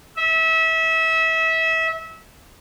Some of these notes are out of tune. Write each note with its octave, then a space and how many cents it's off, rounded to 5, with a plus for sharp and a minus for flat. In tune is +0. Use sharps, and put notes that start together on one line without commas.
E5 -25